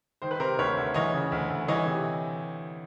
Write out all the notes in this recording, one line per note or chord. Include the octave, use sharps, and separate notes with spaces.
D#3 C5
B4
C3 A#4 C5
D2 B4 C#5
D2
E3 C#5 D#5
C#3
D2
D2
E3 C#5 D#5
C3